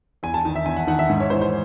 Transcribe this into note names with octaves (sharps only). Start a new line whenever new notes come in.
E2 G#5
A5
D#3
E5
E2 G#5
F#5
D#3 F#5
E5
G#2
C#5
E3 C5
C5